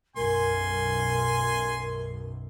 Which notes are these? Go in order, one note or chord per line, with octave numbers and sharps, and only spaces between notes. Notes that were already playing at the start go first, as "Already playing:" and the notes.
B1 F#2 A#4 G#5 C6